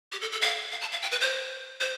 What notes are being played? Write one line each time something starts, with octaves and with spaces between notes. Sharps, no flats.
G4
A4
A4
F5
F5
A5
F5
G5
B4
C5
C5